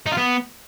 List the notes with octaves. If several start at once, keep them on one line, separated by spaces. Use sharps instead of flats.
D#4
F4
B3